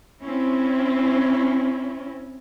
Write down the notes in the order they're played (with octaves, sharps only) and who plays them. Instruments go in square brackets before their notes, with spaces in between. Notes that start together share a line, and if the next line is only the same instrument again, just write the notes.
[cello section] C4 C#4 E4